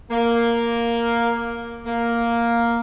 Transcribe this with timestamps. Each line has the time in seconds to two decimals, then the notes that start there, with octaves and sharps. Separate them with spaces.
0.11 A#3
1.86 A#3